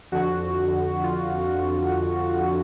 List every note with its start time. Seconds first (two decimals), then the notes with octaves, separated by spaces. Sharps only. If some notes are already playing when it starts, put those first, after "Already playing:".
0.12 F2 D3 F#4
1.04 F4